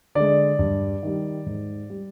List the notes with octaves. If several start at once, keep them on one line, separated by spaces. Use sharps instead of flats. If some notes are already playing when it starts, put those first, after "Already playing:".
D3 G#3 D5
G2
D#3 G3
G#2
G3